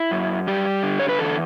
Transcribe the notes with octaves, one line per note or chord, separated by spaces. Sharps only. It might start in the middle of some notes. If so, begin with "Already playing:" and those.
Already playing: E4
F#2
G3 G4
D3
C#5
B4
E2 A4